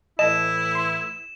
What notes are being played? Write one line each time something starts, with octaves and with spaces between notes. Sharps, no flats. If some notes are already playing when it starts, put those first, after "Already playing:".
A2 E3 E4 D#5 A5 E7
C6